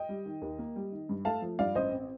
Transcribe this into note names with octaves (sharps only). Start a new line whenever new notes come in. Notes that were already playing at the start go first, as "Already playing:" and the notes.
Already playing: D#5 G5
G3
D#3
D#2
A#3
G3
D#3
G2
A3 F5 A5
F3
G2 D5 F5
A1 C5 D#5
C4